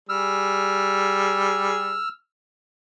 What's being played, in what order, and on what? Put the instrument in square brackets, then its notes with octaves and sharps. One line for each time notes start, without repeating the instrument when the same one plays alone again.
[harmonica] G3 G#4 [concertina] E6 F6